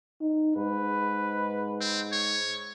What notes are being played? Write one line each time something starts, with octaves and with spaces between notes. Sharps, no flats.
D#4
G#2 B4
C4
C#5